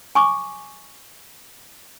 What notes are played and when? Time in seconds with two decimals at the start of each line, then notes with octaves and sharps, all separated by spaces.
0.15 G#5 C#6 D6